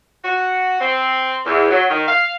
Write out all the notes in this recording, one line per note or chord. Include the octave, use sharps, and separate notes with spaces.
F#4
C4
E2
F#3
D#3
F5